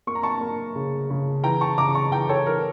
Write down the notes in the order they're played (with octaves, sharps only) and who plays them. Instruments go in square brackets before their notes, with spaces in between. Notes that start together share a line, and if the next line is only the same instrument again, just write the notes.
[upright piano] A#3 C#6
A#5
A5 C#6
A#3
C#3
C#3
E3 G5 A#5
A5 C#6
C#3 A#5 D6
A5 C#6
E3 G5 A#5
A4 C#5
E3 A#4